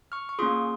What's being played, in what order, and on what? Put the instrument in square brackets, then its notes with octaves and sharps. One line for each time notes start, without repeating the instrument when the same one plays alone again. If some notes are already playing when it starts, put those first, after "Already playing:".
[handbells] C#6 F6
C#6
A#3 C#4 F4 G#4 C6 D#6